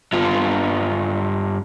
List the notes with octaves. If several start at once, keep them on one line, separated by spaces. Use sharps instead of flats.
G2 F4